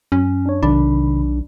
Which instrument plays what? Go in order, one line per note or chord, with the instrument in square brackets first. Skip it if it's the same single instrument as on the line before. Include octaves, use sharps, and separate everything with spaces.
[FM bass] F#2 [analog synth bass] C#4
[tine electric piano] D4 C#5
[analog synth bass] B1 [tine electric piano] C3 D#3 B5 [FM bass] D4